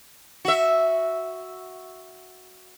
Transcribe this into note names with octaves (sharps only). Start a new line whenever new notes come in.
F#4 E5